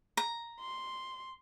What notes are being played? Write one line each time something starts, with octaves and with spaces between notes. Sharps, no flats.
A#5
C6